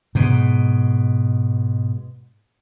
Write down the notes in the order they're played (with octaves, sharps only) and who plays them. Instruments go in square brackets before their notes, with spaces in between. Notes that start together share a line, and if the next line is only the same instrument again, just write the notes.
[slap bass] G#2 B2